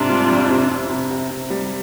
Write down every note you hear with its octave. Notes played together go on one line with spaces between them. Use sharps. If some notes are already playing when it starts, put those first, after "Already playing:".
Already playing: G#2 C3 D4 F4
G3
F2
C3
C3
C3
C3
C3
G3